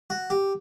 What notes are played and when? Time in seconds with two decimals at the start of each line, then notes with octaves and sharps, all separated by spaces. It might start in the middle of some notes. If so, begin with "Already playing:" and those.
0.10 F#4
0.30 G4